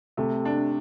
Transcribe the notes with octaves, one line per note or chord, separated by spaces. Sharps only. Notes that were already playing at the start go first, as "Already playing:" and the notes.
C3 A3
D4